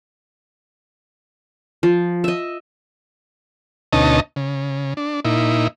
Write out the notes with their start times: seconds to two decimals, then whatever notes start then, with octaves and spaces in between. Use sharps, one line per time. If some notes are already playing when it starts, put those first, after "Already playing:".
1.83 F3
2.24 D#5 E5
3.93 D2 B2 C#4 D#4 D#5 A5
4.36 C#3
4.97 D4
5.25 A#2 D#4 E4